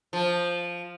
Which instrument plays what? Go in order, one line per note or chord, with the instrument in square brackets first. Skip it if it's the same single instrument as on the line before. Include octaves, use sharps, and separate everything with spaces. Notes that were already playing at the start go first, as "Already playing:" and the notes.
[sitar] F3